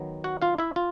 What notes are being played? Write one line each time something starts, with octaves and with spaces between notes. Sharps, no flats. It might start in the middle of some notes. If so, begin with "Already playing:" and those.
Already playing: D#3 F#3 B3
F#4 F#5
F4 F5
E4 E5
F4